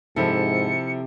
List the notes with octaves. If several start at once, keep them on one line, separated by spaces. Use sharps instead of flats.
G#2 C3 F3 E4 A4 C#7